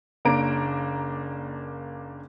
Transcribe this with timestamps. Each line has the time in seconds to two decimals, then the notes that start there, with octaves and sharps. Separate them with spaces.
0.25 F#1 A#3 D4 A#5 D7